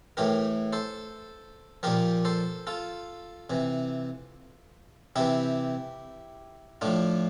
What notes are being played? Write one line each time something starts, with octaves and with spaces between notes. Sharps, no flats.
A2 E3 G4 A#4
A4 C5
A#2 F3 G4 A#4
A4 C5
F4 A4
C3 E3
C3 E3 E4 G4
A2 F3 D4 F4